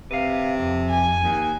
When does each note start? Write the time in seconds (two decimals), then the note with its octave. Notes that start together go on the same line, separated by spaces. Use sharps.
0.11 C3 B4 F5
0.59 F2
0.90 G#5
1.23 D#2